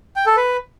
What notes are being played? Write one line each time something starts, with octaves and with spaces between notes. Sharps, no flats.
G5
A4
B4